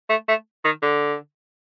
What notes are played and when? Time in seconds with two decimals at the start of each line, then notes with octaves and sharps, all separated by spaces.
0.10 A3
0.28 A3
0.65 D#3
0.83 D3